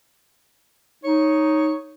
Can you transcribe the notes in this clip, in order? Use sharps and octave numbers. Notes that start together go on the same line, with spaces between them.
D#4 C#5